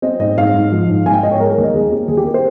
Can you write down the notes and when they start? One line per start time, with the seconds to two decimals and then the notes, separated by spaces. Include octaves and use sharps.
0.02 C4 D#5
0.19 G#2 D#5
0.38 G#2 F5
0.54 G#2
0.72 F3
0.89 G#2
1.06 G#2 G#5
1.14 G5
1.22 G#2 D#5
1.31 C#5
1.40 G#3 A#4
1.52 A#4
1.57 D#2
1.63 D#5
1.74 D#2 G#4
1.91 C4 G4
2.08 D#2 G#4
2.17 G4
2.25 A#4
2.34 C5